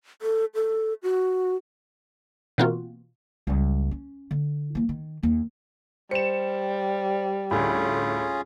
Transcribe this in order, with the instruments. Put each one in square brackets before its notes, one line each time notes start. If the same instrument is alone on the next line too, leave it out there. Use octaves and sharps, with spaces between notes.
[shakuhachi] A4
A4
F#4
[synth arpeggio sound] B2 E3 A#3 C4 F4 F#4
[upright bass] C#2 G3
C#4
D3
E3 A#3
D#3
D#2 A#3
[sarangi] G3 [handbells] C5 [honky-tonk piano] C#7 E7
[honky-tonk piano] D2 A2 [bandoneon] C#4 F4 G#4 [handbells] B5